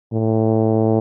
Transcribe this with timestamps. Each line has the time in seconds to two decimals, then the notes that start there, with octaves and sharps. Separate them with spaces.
0.13 A2